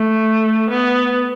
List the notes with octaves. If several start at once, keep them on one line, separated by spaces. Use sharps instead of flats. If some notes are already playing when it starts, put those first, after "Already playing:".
Already playing: A3
B3